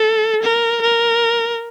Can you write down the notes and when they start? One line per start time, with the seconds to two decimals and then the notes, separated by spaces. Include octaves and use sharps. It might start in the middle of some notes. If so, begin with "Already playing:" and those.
Already playing: A4
0.43 A#4
0.82 A#4